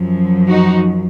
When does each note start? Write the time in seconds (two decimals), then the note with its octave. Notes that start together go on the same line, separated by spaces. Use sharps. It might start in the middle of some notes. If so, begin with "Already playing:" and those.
Already playing: F#2 F3
0.49 D#4 F#4